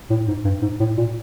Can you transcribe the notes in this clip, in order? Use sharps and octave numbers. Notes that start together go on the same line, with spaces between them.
A2
G#2
G2
G#2
A2
A#2